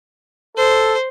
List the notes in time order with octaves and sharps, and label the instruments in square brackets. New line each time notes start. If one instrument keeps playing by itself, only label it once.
[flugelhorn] A4 [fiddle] C5